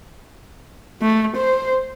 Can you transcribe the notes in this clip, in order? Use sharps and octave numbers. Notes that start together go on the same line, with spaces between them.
A3
C5